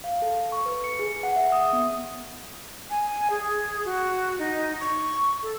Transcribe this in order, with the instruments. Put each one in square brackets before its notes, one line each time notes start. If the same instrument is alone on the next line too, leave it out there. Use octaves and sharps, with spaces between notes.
[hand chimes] F5
A4
C#6
B4
C#7
G#4
F#5
E5
D#6
B3
[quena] G#5
G#4
F#4
D#4
C#6
A4